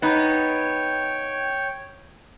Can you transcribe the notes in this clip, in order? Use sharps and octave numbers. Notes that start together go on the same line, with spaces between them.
B3 D#4 C#5 G5